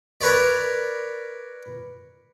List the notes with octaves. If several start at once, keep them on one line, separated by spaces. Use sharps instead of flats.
A#4 B4 C#5 D5